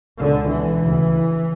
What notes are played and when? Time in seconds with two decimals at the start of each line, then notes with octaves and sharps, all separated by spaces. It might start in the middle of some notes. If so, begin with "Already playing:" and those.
0.19 C#2 B2 D3
0.50 E3
0.82 D2 C#3